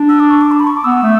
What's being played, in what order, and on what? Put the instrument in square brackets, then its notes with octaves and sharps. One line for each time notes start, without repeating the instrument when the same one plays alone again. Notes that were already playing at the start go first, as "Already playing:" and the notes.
Already playing: [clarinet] D4
[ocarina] E6
D6
C#6
D6
A5
B5
C#6
D6
[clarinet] B3 [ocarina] E6
[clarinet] A3